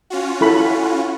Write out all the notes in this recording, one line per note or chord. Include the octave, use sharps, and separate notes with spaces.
C#4 F4 F#4
E4 A4 B5